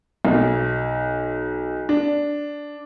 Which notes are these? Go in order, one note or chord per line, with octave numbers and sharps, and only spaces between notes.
B1
D4